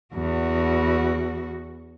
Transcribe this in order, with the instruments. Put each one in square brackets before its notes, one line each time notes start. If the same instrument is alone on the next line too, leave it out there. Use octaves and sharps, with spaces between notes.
[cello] E2 F#4